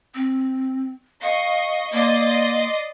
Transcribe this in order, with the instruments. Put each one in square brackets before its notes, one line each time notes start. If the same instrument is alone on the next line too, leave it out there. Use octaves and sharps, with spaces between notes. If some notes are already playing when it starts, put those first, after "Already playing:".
[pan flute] C4
[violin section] D#5 C#6 [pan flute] F5
[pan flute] A#3 [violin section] D5 D#5 C6